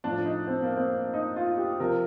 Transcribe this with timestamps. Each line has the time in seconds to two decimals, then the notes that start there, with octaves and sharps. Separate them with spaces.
0.04 A2 F3 D4
0.26 D#4
0.47 C4
0.62 A#3
0.77 C4
1.14 D#4
1.36 F4
1.58 G4
1.79 C3 F3 A#4